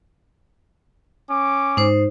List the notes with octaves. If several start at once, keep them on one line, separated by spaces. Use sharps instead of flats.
C#4 D6
G#2 D#4 C5